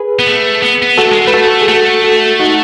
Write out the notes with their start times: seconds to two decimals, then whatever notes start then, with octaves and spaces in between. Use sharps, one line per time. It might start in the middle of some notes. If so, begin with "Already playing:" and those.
Already playing: G#4 B4
0.19 B3
0.27 A3
0.63 B3
0.83 B3
0.98 A3 F#4 A4
1.12 G#3
1.26 A3 B4
1.33 F#4 A4
1.62 G#4
1.68 A3 F#4 A4
2.04 F#4 A4
2.39 D#4 F#4